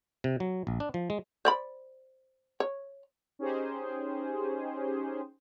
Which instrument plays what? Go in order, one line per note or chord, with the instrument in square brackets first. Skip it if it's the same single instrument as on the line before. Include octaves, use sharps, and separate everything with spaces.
[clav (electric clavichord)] C3
F#3
A#1
D4
F3
G#3
[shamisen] C5 D5 B5
C#5
[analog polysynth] C#4 D#4 G4 G#4 C5